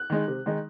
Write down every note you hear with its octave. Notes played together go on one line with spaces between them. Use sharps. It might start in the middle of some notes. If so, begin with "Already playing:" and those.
Already playing: F#6
D#3 G#3 D#4
C3
D#3 G#3 D#4